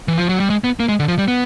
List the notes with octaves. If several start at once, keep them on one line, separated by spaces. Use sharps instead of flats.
E3
F3
F#3
G3
G#3
B3
A#3
G#3
D3
F3
G3
B3